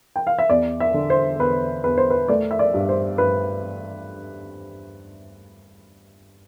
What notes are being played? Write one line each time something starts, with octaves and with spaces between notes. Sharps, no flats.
G5
F5
E5
E2 D5
E5
D3
C5
E2 B4
E2 B4
C5
B4
A3 D5
E5
D5
G2
C5
G2 B4